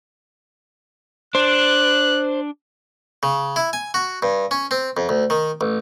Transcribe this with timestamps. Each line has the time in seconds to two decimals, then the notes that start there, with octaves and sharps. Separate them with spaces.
1.35 D4 C5 F#6
3.23 C#3
3.56 E4
3.73 G#5
3.94 F#4
4.23 G2
4.51 C#4
4.71 C4
4.97 F2
5.09 D2
5.30 D#3
5.61 A1